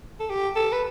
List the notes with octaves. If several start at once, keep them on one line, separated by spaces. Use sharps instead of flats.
A4
G4
A4
B4